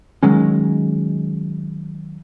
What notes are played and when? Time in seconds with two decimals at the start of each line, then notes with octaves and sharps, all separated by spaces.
0.23 D#3 F#3 G#3 C#4